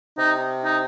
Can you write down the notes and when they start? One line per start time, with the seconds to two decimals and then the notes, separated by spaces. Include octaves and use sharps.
0.18 C3 D#4
0.64 D#4